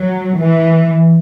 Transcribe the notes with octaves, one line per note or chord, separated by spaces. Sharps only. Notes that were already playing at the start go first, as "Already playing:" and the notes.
Already playing: F#3
E3